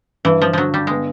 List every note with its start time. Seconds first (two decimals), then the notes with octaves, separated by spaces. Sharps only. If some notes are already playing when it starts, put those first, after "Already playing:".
0.25 G2 E3
0.42 F3
0.53 D3 F3 F#3
0.74 G3
0.87 G#3 B3